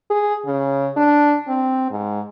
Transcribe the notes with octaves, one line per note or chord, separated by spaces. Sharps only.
G#4
C#3
D4
C4
G#2